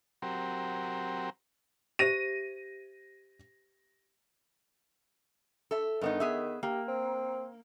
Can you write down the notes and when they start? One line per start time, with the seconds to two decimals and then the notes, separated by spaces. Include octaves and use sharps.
0.22 F#3 C4 G4 A#4
1.99 G4 C5 E5 A#6 D#7
5.71 A4 E5
6.01 G2 D#3 B3 D#4
6.20 B3 G#4 E5
6.63 A#3 G4
6.88 C4